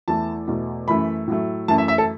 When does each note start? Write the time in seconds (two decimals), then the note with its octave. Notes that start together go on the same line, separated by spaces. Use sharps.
0.08 E2 E3 A3 A5
0.48 E2 B2 A3
0.88 F#2 E3 A3 B5
1.28 A2 F#3 A3
1.68 F#2 E3 A3 A5
1.78 E5
1.88 E5
1.98 A4